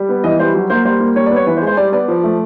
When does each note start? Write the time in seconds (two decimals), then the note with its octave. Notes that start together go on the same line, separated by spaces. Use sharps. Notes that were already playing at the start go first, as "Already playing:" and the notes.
Already playing: G3
0.09 B3
0.24 E3 D#5
0.39 G3 C5
0.54 F#3
0.70 A#3 C5
0.85 G3 C5
1.00 A#3
1.16 G3 C#5
1.26 D5
1.31 B3
1.36 C#5
1.47 E3 B4
1.57 C5
1.62 G#3
1.67 C5
1.77 G3 D5
1.92 B3 D5
2.08 F3
2.23 A3